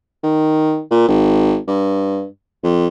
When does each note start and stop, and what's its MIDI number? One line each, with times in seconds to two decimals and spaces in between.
0.24 0.81 51
0.91 1.05 46
1.08 1.58 32
1.68 2.26 43
2.64 2.88 41